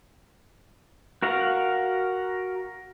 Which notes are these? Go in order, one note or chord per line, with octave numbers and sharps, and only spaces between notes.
F#4 A#4 F5 F#5